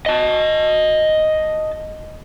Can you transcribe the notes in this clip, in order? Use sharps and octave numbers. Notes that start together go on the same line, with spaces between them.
D#5 A5